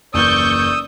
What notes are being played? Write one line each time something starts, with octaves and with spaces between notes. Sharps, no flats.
F#1 D#2 E3 D5 C#6 D#6 E6 G6